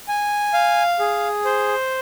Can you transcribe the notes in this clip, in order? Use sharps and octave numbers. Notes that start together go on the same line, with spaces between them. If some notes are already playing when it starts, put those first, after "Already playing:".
G#5
F5
G#4
C5